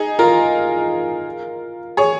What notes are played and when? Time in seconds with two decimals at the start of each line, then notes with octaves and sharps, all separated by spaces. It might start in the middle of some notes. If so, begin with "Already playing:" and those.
Already playing: D#4 G#4
0.19 F4 A#4
1.97 G#4 C#5